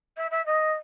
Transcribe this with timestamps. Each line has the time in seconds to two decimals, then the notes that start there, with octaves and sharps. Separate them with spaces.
0.17 E5
0.31 E5
0.46 D#5